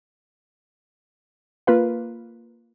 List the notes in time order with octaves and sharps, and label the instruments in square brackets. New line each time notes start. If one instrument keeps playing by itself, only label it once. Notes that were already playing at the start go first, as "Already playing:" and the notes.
[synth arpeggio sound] A#3 F4 B4 F5